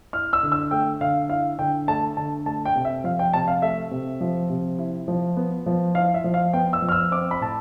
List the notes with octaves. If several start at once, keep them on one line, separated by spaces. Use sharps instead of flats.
E4 F6
E6
D3
E6
A3 G5
D3 F5
E4 F5
D3 G5
A3 A5
D3 A5
A3 A5
G5
C3
E5
F3 F5
G5
C3 A5
F5
A3 E5
C3
F3
C3
E4
F3
B3
F3
E4 F5
E5
F3
F5
B3 G5
E6
F3
F6
E6
C4 D6
B5
A2 A5